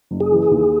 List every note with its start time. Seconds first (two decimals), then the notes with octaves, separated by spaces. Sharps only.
0.11 F#1
0.20 G#4
0.31 E3
0.51 D#2